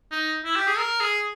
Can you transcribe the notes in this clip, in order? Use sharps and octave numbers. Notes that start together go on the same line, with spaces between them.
D#4
E4
G4
G#4
A#4
G#4